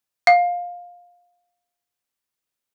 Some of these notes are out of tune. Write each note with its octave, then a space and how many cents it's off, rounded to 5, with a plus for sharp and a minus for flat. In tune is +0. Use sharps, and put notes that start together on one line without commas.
F5 +15